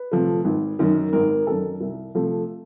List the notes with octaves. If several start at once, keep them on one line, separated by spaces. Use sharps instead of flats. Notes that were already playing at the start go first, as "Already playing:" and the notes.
Already playing: B4
C3 F3 A3
G#1
F#2 D#3
G#1 A#4
A#4
F#2 D#3 A4
C2
C3 F3 A3